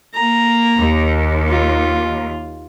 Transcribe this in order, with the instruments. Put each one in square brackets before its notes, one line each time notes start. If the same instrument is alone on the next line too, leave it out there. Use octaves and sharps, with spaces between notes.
[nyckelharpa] A#3 A#5
[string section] D#2
[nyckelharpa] F4